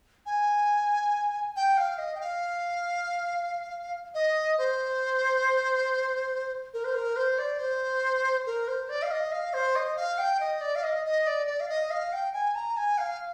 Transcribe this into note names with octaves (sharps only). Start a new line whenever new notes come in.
G#5
G5
F5
D#5
G5
F5
D#5
C5
A#4
C5
A#4
C5
D5
C5
A#4
C5
D5
F5
D#5
F5
C5
D#5
F5
G5
D#5
D5
F5
D#5
D#5
D5
D5
F5
D#5
F5
G5
G#5
A#5
G#5
F5